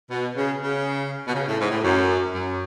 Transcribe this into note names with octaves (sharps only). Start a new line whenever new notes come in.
B2
C#3
C#3
B2
C#3
A2
G#2
A2
F#2
F#2